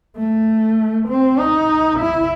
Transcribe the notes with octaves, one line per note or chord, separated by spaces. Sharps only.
A3
C4
D#4
E4